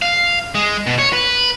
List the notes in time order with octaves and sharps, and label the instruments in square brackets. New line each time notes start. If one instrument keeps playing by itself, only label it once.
[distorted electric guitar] F5
G#3
B2
C#5
B4